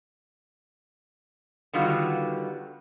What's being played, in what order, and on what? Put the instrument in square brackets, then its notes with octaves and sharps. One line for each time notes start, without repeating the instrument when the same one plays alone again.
[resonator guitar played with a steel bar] D3 D#3 G3 B3 F4 F#4